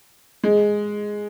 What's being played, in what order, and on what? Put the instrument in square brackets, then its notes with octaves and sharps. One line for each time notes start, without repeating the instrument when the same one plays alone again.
[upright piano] G#3